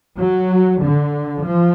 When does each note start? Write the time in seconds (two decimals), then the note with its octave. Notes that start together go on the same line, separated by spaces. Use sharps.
0.18 F#3
0.81 D3
1.42 F3